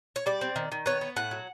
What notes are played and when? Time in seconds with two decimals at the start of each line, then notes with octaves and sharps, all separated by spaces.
0.16 C#5
0.26 G3 D5
0.41 C4
0.56 D#3
0.72 D#3
0.86 B3 C#5
1.01 B3
1.16 A2 F#5
1.31 F#3